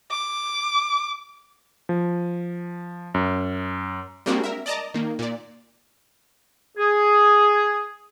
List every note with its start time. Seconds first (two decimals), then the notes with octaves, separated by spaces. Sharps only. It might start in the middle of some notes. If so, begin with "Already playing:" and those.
0.11 D6
1.89 F3
3.14 F#2
4.26 G3 G#3 A#3 C4 D4 F#4
4.44 A#4 E5
4.66 D5 D#5 A5 A#5 D6
4.94 D#3 A#3
5.19 A#2 D5
6.78 G#4